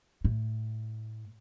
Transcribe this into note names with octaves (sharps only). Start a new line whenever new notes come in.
A2